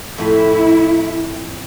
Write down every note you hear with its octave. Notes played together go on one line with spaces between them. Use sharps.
F2 A2 E4